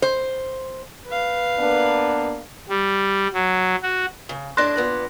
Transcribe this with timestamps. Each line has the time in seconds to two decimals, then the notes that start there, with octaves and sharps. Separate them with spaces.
0.02 C5
1.07 B4 F5
1.58 A#3 B3 D4
2.69 G3
3.33 F#3
3.83 F#4
4.29 C#3
4.57 A2 D4 C6 F#6 A#6
4.76 A#2 B3 D5